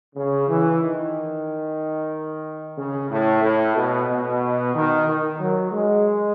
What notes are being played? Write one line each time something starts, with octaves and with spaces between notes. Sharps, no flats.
C#3
E3
D#3
C#3
A2
A2
B2
B2
D#3
D#3
F#3
G#3